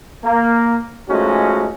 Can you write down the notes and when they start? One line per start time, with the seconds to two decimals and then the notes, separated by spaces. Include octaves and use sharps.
0.24 A#3
1.09 F3 G#3 A3 C#4 D#4 F#4